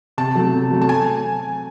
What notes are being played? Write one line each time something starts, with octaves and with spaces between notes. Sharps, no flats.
C3 A5
F#3 A3
C3
F#3 A3
A5
G#5